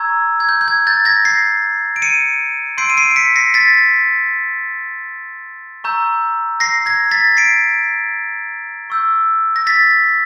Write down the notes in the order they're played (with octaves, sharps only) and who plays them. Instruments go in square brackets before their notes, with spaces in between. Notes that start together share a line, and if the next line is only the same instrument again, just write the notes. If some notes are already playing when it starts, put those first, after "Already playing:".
Already playing: [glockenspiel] A#5 C#6 E6 G6 G#6
G#6
G6
G6
G#6
G6 A6
G#6 A#6
A#6 C7
D7
C#7 D#7
C6 E6 G6 C7 D7
D#7
C7 D7
D7
B6 C#7
A#6 C7
A6 B6
A#5 C#6 E6 G6
A#6 C7
G#6 A#6
A6 B6
C7 D7
C#6 E6 G6
A#6
A6 B6